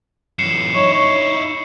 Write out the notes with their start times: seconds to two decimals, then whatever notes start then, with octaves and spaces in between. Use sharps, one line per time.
0.39 F#2 E3 C7 C#7 E7
0.75 D#4 E4 C#5
0.93 C#5